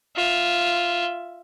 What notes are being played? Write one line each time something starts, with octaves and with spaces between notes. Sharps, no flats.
F4 E5